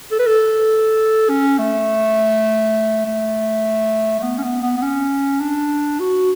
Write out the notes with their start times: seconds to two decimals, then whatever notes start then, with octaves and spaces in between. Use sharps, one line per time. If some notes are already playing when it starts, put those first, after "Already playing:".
0.11 A4
0.19 B4
0.27 A4
1.29 C#4
1.58 A3
3.06 A3
4.19 A3
4.23 B3
4.38 C#4
4.43 B3
4.63 B3
4.77 B3
4.82 C#4
5.40 D4
6.00 F#4